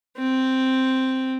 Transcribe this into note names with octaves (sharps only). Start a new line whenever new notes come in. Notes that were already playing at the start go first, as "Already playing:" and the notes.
C4